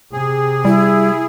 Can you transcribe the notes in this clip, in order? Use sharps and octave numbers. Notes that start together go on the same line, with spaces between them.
C3 G#4
G3 E4